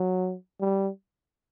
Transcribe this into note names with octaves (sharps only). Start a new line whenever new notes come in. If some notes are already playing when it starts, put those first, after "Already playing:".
Already playing: F#3
G3